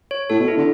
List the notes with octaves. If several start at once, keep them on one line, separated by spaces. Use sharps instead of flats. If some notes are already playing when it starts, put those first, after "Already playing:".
C#5
A2 A4
B2
E4
D3